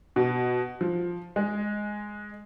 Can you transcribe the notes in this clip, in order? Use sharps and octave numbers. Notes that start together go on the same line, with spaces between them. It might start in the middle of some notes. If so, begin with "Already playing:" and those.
B2
F3
G#3